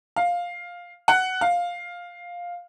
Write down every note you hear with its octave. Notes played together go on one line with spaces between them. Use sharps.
F5
F#5
F5